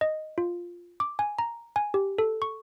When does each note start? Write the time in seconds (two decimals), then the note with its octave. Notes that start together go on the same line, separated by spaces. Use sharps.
0.01 D#5
0.38 F4
1.00 D6
1.19 G#5
1.39 A#5
1.76 G#5
1.94 G4
2.18 A4
2.42 C#6